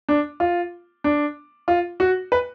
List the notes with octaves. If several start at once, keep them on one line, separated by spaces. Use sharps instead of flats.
D4
F4
D4
F4
F#4
B4